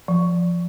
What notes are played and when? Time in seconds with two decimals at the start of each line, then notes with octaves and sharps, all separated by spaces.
0.08 F3